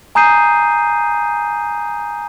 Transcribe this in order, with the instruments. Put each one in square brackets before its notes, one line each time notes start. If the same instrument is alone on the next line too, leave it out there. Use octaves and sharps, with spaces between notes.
[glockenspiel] G#5 A#5 D#6 G6 C7 D#7